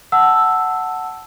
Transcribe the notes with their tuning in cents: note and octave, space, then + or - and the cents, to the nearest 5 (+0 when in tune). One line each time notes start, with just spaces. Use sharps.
F#5 +0 A5 +0 E6 +0